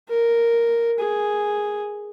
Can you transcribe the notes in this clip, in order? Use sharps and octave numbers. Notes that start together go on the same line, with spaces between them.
A#4
G#4